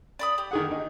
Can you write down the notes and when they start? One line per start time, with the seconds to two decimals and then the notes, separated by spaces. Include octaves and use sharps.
0.19 D5 B5 D#6
0.38 G4
0.51 D#3 G#4 F#5
0.71 D#4